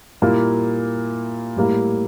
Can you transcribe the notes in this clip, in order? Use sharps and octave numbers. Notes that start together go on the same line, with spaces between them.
A#2 G3 A#3 E4
A2 G3 A#3 E4